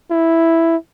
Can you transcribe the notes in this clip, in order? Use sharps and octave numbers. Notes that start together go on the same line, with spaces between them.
E4